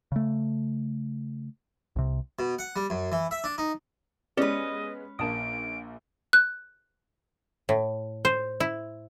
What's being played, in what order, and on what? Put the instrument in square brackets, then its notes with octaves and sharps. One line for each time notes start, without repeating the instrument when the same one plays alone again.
[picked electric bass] C#3 A3
C2 C3
[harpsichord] B2
F#5
G3
F#2
E3
E5
D4
D#4
[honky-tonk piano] G#3 B3 [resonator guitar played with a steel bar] C#4 B4 [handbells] G4 D5 C#7 [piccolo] D#5
[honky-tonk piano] A#1 A#3 [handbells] A5 D#6 [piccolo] D7
[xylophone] F#6
[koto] A2
C5
E4